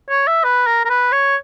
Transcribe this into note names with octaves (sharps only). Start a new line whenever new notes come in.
C#5
E5
B4
A#4
A#4
B4
C#5